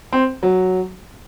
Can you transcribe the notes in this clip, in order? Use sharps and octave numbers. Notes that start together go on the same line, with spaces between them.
C4
F#3